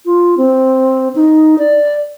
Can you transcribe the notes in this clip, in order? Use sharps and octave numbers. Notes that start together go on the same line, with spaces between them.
F4
C4
D#4
D5